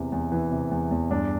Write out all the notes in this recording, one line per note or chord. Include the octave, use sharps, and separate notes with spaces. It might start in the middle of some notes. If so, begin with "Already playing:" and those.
Already playing: E2 C3 E3
E2
E3
C3
E2
E2
G2 D4